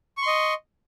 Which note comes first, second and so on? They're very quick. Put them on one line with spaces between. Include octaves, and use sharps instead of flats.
C#6 C6 D#5